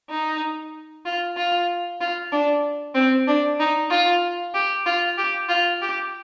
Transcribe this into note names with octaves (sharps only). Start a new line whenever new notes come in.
D#4
F4
F4
F4
D4
C4
D4
D#4
F4
G4
F4
G4
F4
G4